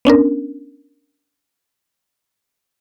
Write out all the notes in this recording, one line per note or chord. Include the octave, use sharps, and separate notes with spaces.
B3 C#4 D4 A#4